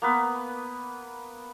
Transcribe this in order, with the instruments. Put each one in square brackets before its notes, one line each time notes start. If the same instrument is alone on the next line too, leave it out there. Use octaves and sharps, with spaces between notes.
[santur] A#3 B3 B4